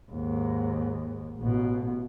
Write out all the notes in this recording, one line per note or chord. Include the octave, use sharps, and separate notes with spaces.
D#2 G#2
A1 B2